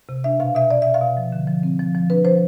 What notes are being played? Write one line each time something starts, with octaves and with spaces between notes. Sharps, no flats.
C3
D4 E5
B2 F5
B2 E5
B2 D5
B2 E5
F5
B2
F3
D3
F3
C4
F3
F3
D4 B4
F3 C5